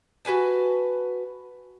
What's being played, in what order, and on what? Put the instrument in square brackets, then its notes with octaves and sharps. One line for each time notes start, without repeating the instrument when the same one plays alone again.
[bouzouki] F#4 B4 G#5 A5